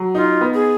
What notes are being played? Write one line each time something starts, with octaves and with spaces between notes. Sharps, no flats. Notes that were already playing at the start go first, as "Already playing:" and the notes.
Already playing: F#3
D#4 F4
B3
G#4